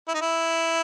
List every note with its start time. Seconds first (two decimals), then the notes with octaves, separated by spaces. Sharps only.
0.08 E4
0.14 D#4
0.21 E4